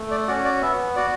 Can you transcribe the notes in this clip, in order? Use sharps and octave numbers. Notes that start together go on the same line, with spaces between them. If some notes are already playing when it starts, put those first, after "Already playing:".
Already playing: A3
D5
C#4 F#4 D5
D5
B3 E5
F#4 D5